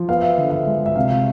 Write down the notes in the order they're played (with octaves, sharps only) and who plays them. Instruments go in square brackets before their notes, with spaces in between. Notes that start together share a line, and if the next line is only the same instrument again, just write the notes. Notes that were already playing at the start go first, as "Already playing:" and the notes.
Already playing: [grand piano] F3
B3 F5
E5
D3
E5
G#3
E5
C3 F5